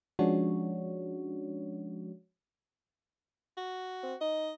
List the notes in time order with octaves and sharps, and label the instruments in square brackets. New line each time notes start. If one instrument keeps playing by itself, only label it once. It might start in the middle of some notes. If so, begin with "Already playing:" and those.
[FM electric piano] F3 G#3 C#4 D4 F#4 C#5
[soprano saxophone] F#4
[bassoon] C4
[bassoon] D#4 [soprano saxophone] D#5